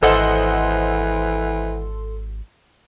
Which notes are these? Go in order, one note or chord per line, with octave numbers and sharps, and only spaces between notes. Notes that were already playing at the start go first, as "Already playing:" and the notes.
G#1 E3 A4 C5 D#5 F#5 C6